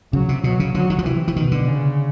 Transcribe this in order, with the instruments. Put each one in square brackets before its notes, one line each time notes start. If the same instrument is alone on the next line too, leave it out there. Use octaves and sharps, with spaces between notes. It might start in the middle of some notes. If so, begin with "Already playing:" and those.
[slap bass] C#3 [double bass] F#3
[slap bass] C3
[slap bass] B2 [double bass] F#3
[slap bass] C#3
[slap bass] D3 [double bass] F#3
[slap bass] D#3
F3
[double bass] C3 [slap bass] E3
[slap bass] E3
[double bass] B2 [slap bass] D#3
[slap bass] D3
[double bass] C#3